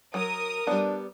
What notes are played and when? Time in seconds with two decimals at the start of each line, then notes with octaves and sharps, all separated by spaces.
0.14 F#3 A#4 D#6
0.67 G3 B3 D4